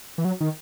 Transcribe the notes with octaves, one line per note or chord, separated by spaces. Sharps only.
E3
F#3
D#3